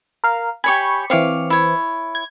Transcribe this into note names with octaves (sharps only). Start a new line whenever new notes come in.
A#4 F5
G4 C#5 G#5 B5 C#6
E3 C4 C#5 F5 D6
E4 C#5
G#6